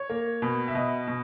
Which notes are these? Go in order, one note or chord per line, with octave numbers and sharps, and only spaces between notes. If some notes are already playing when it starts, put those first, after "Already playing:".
Already playing: C#5
A#3
B2
E5
B2 D#5
B2